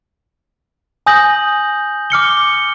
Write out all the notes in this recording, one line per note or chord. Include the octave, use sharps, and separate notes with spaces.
G#5 D#6 G6 A#6 F#7
D6 F6 C#7 G7